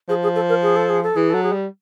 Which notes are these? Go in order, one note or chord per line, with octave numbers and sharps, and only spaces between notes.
F3 G#4
G#4
A4
A#4
G#4
A4
G#4
A4
E3 G#4
A4
F#3
G#4
G3